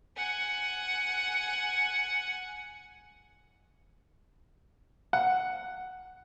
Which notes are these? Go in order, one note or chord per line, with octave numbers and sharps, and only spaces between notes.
F#5 G#5
F#5